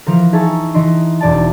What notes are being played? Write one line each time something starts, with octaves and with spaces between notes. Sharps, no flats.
E3 F3 A#4
D#4 G#4 B4 E5 A5 C#6
E3 D#4 D#5 C6
E1 D5 A5